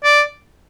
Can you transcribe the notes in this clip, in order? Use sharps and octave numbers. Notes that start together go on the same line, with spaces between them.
D5